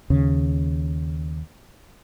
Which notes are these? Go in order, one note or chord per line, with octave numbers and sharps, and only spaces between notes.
D#2 C#3